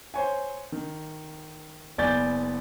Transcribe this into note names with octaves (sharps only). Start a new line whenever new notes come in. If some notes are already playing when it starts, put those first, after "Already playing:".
C5 C#5 G#5
D#3
F#1 B3 D5 G#5 G6 A6